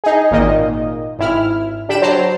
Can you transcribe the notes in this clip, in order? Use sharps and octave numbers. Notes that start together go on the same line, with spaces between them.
D#4 G#4
G#1 A#2 D#3 A#3 D#5
G#1 E4 F6
D3 G4 B5 D7 E7
F#3 C5 A5 A#5 C7